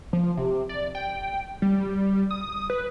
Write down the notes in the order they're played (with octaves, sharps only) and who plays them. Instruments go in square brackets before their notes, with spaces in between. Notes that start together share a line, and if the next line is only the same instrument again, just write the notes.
[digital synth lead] F3
C3
D5
G5
G3
D#6
B4